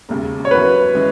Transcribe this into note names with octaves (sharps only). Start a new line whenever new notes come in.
E1 D#2 C#3
C#5
F#2 E3 B3 F#4 A#4 B4
E3 G#3 C#4